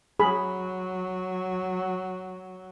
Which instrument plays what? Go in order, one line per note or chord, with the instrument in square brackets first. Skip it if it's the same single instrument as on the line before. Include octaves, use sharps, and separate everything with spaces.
[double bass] F#3 [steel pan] G#4 B5